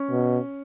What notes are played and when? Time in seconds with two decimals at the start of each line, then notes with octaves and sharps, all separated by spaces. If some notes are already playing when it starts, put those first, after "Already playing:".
Already playing: C#4
0.10 B2